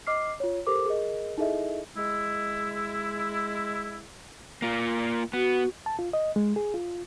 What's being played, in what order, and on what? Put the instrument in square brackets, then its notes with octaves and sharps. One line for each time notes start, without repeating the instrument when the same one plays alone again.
[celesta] D#5 D6 F6 C7
F4 C#5
G4 A4 A#4 C5 D6
G#4 A#4 D#5
D#4 E4 G#4 A4 D#5 E5
[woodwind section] G#3 E4
[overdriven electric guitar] A#3 F4
[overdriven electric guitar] B3 [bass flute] F#4
[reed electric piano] A5
F4
D#5
G#3
G#4
F4